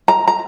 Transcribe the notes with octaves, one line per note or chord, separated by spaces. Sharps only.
A#5
A#5